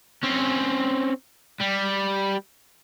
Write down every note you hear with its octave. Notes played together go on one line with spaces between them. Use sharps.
C4 C#4
G3